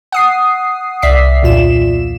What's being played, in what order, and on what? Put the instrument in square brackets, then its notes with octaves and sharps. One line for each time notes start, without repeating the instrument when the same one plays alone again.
[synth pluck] F#5 D#6 C7
C2 D5 E5 B6 C7
E2 A#2 F4 E7